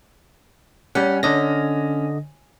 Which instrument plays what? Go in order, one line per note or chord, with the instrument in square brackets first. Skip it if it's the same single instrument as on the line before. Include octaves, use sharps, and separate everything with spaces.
[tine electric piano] G3 F#5 [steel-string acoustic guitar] C#4
[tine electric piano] D3 D#5 A#6 [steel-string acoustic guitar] C#4